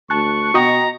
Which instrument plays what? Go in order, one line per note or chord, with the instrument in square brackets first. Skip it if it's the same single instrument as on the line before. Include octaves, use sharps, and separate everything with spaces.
[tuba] D2 [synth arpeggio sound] A5 F#6 [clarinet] C#6
[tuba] B2 [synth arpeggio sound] F#4 D#5 G5 [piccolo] A#5